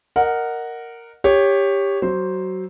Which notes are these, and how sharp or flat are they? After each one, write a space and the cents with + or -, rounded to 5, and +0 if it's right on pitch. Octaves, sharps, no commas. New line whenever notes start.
A#4 -5 D#5 -15 F#5 +0
G4 +15 C#5 +0
F#3 +20 C5 +0